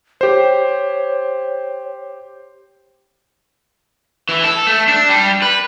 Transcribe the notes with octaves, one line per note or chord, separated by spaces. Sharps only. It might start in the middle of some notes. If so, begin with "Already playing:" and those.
G4 C5 C#5
E3
A4
A3
D4
G3
B4